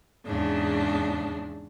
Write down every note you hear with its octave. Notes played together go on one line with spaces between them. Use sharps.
E2 G#2 C#3 D4